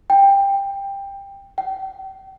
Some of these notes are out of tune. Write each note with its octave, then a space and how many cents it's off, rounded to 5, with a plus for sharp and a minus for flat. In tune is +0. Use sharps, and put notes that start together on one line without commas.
G5 +15
G5 -35